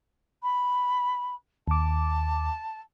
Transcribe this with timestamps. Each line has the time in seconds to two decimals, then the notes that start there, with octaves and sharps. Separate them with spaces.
0.43 B5
1.68 D#2 A5 D6